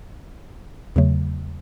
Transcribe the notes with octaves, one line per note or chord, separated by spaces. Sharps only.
E2 C#3 F#3 A3